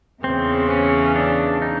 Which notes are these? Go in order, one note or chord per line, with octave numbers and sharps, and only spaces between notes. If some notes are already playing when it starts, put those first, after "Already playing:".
E2 C#3 E3 C4
C#4
D4
D#4